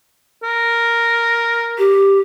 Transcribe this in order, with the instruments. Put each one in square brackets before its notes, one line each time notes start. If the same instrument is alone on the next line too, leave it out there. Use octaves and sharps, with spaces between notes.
[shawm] A#4
[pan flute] G4